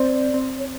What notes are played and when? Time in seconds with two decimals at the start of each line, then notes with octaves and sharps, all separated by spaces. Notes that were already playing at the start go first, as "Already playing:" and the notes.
Already playing: C4 C5 D5
0.34 C4
0.59 C#5